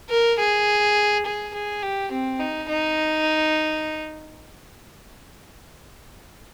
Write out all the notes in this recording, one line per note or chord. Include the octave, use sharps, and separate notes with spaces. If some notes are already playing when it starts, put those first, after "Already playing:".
A#4
G#4
G#4
G#4
G4
C4
D#4
D#4